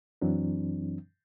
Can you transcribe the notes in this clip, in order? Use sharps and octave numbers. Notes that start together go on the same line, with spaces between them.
F#2 E3 F#3 C4 D4